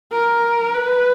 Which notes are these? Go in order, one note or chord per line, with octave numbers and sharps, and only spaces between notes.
A#4
B4